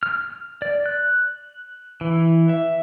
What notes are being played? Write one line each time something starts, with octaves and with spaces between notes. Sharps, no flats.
F6
D5
F#6
E3
E5